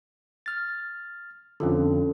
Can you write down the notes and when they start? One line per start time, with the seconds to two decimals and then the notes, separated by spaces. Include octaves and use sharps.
0.46 F6 A6
1.60 F2 D3 C#4 F4 A4